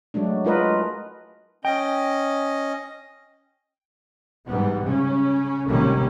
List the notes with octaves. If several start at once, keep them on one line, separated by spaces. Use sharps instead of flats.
F#3 G#3 A3 D4
G#3 E4 F4 A#4 B4 D#5
C#4 D#5 G5
G#2 E3 G3 B3
C#3 C#4
G#1 C3 D#3 G3 A#3 C#4